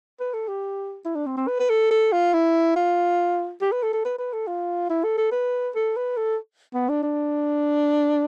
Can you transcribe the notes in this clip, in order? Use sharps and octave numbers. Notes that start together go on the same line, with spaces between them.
B4
A4
G4
E4
D4
C4
C4
B4
B4
A4
A4
F4
E4
F4
G4
B4
A4
A4
B4
B4
A4
F4
E4
A4
A4
B4
A4
B4
A4
B3
D4
D4